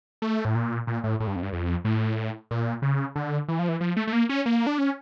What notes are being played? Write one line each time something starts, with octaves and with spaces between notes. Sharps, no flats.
A3
A2
A#2
A#2
A2
A2
G2
F2
G2
F2
A2
A#2
C#3
D3
E3
F3
E3
F3
A3
A3
A#3
C#4
A#3
D4
C#4